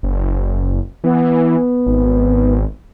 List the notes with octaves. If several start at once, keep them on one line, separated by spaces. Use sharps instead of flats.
F#1
E3 B3
G#1